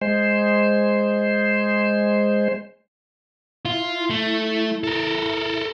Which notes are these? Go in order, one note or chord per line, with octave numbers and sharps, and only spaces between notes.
G#3 C5
E4 F4
A3
A4 A#4